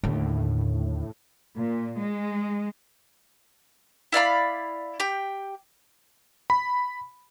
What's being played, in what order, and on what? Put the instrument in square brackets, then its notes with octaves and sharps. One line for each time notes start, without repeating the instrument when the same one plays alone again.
[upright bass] D#2 D3 [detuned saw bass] A2
[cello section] A#2
G#3
[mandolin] E4 D5 F5 B5
G4 G5
[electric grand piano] B5